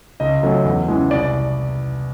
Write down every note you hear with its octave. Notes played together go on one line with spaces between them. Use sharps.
C#2 D#5
C#3 F#3 A3 C#4
E2
C#3 E3 G#3
C2 D5